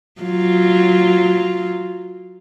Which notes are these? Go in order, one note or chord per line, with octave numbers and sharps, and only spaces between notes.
F#3 F4